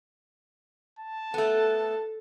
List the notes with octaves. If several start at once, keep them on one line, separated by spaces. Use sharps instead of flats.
A5
A3 B3 A4